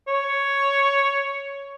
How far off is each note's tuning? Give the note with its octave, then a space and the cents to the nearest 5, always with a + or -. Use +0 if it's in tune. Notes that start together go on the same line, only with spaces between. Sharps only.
C#5 +5